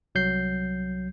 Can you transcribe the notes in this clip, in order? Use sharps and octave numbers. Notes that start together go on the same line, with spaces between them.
C2 F#3 G6 C7